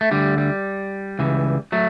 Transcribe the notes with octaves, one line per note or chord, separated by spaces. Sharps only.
A3
D2 D3 G3
G3
C#2 C#3 E3
F#3 A3